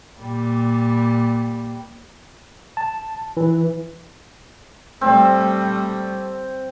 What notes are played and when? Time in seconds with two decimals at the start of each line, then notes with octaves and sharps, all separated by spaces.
0.20 A#2 G3
2.77 A5
3.37 E3
5.01 G3 A3 C4